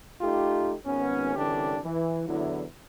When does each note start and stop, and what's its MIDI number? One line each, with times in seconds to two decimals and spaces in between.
0.21 0.73 57
0.21 0.73 63
0.21 0.73 65
0.21 0.73 67
0.84 1.34 32
0.84 1.34 59
0.84 1.34 61
1.35 1.76 36
1.35 1.76 50
1.35 1.76 52
1.35 1.76 61
1.35 1.76 62
1.35 1.76 67
1.83 2.26 52
2.27 2.64 40
2.27 2.64 50
2.27 2.64 54
2.27 2.64 64